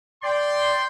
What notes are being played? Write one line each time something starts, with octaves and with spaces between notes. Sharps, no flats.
D5 G5 C6